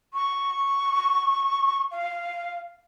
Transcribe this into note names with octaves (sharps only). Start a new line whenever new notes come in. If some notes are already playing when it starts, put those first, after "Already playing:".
C#6
F5